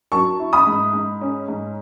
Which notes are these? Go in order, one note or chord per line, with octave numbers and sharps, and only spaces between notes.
F#3 A5 C#6
E4
B5 D#6
G#2
G#2
C#4
G#2